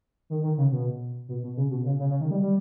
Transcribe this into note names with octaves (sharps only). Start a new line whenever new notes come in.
D#3
D#3
C#3
B2
B2
B2
C#3
B2
C#3
C#3
C#3
D#3
G3
G3